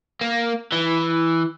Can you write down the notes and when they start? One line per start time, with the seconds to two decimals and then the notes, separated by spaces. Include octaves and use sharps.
0.21 A#3
0.72 E3